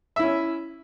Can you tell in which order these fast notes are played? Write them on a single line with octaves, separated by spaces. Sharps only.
E5 E4 C#4